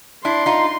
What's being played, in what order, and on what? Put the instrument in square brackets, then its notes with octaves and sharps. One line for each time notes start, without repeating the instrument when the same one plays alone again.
[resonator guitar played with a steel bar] D4 E4 [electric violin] C6
[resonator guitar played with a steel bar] D#4 F4